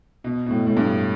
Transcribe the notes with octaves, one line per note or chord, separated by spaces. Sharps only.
B2
B2
A2
A2
G2